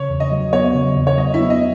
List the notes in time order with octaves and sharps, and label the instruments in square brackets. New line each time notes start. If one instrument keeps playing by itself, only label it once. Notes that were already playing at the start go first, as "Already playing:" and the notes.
Already playing: [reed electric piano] C#3 [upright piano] C#5
[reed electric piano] E2
[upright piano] D#5
[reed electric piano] F#3
[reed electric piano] B3 [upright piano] C#5
[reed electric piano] C#3
E2
[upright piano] C#5
[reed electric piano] F#3 [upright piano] D#5
[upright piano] E4 E5
[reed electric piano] B3
[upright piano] D#5